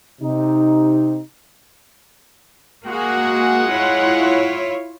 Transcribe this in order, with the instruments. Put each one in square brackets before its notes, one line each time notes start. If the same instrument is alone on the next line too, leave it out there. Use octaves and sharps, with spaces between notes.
[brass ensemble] C3 D#4
[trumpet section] G#3 F#5 [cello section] A#3 F#4 G#4
[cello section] E4 F4 C#5